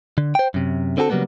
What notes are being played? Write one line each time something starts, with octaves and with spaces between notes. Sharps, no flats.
D3
C5 G5
F#2 C3
D3 C4 F#4 G#4 A4
C#3 F#3 G3 A#3 B3